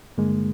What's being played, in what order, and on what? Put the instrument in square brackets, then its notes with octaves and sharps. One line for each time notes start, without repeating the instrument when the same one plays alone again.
[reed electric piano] G2 D3 G#3 A#3